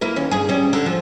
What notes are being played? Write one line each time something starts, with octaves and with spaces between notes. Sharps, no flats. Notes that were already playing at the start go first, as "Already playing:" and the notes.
A#3 E4 B4
D#2 C#4
G2 G#4
G3 C#4
D3
F3